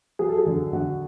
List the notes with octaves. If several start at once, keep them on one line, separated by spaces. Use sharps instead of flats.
F#3 G#4
A4
G#4
D3
D3 F#4